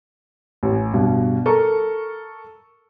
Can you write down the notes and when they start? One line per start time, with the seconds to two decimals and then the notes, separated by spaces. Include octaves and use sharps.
0.63 A1
0.93 G2 B2
1.46 A4 A#4 C#6